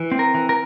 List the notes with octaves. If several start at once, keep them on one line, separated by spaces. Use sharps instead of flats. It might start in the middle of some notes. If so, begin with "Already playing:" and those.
Already playing: E3
C4
A#4
E3
A#4